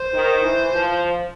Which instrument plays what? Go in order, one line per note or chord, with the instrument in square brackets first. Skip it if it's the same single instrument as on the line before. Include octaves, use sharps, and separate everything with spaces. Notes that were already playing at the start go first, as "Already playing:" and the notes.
Already playing: [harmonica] C5
[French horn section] D#3
E3
F3